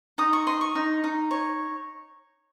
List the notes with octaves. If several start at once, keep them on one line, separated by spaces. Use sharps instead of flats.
D#4 D#6
C#6
D#5 C6
C#6
D#4
D#4
C#5